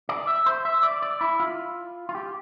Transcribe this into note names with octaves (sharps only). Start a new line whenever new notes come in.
D5
E5
C5
E5
D5
D5
E4
F4
F4
G4